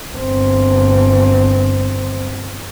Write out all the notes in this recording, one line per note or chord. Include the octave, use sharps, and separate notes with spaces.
G1 C4